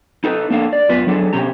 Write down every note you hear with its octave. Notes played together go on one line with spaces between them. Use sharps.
D#4 A4 B4
A#3 D4 A4 F5
D5
F#2 B3 F4 B4
F#3 D4 G#4 A4
B2 C#4 G4 A#5